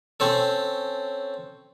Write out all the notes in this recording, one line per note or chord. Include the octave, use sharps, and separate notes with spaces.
C4 C#4 A4